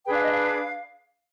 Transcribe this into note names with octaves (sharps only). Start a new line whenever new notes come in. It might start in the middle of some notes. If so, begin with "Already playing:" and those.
D4 G#4 B4 G5
F5
D#5
F5